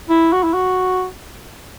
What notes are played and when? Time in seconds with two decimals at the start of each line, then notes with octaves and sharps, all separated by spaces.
0.09 E4
0.33 F#4
0.43 E4
0.53 F#4